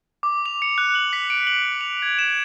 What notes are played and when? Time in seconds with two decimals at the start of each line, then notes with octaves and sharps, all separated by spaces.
0.23 D6
0.46 F7
0.62 C#7
0.78 F#6
0.95 F#7
1.13 B6
1.30 D7
1.47 F#7
1.81 F7
2.02 G#6
2.19 E7